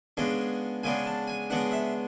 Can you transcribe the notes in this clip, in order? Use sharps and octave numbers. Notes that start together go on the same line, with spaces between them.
C#3 G#3 B3 D4
C#3 G#3 B3 D4 G#5
A5
G#5
C#3 G#3 B3 D4 F#5
E5